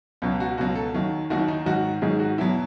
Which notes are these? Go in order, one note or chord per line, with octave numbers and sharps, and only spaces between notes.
C#2 B2 F#3
F#4
C#2 B2 F#3 F#4
A4
D#2 D#3 F#3
D#2 D#3 F#3 F#4
E4
D#4
G#2 D#3 F#3 F#4
G#2 D#3 F#3 G#4
F#4
E2 B2 F#3 E4